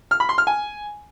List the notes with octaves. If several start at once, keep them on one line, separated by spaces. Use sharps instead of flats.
F6
B5
C6
F6
G#5